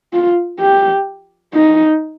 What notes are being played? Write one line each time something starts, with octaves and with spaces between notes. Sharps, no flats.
F4
G4
D#4